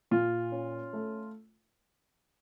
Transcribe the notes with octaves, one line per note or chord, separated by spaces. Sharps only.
A#2 F4
C#4
A3